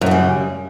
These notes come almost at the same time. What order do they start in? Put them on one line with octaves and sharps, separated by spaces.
F#2 C#3 G3